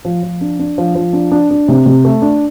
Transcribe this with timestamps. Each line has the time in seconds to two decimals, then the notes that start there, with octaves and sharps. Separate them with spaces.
0.05 F3
0.23 F3
0.41 D4
0.59 D4
0.78 F3
0.95 F3
1.13 D4
1.31 D4
1.50 D4
1.68 C3
1.86 C3
2.05 A3
2.22 D4